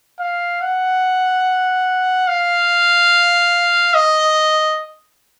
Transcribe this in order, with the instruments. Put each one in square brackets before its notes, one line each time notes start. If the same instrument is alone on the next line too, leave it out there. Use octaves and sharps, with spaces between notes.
[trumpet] F5
F#5
F5
D#5